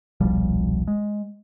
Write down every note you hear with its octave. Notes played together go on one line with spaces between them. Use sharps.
D#1 B1 F3 G3
G#3